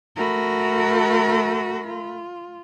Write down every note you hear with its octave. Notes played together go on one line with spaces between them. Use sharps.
A3 F#4 A#4 B5
F4